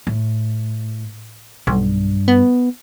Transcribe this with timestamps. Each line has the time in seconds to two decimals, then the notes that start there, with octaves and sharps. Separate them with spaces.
0.07 A2
1.67 B1 G2
2.28 B3